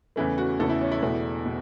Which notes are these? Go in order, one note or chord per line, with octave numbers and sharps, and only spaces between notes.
E2 C#3 E3 A3 E4
F#4
E2 C#3 E3 A3 A4
E4
C#4
E4
E1 E2 B2 A3
B2